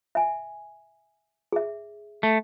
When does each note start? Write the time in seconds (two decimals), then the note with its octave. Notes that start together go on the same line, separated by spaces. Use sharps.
0.15 E5 G#5
1.52 G#4 E5
2.23 A3